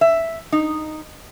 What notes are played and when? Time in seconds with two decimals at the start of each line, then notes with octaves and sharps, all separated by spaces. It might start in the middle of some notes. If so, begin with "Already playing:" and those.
0.01 E5
0.52 D#4